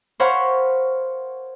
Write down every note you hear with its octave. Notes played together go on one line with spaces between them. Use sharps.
A#4 C5 C#5 F5 F#5 B5